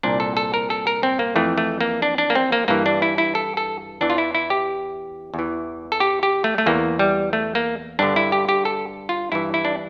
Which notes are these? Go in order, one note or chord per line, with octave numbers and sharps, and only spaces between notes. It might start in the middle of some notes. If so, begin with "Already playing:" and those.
C2 A#2 D4
A4
A4
A#4
A4
A#4
C4
A#3
F2 E3 A3
A3
A#3
D4
D4
A#3
C4
A#3
G2 E3 A#3
D4
E4
E4
A4
A4
E2 E3 D4
F4
E4
E4
G4
E2
E3
A4
G4
G4
A3
A3
E2 E3 A#3
G3
A3
A#3
G2 D3 D4
E4
G4
G4
A4
F4
G2 E3 E4
E4
D4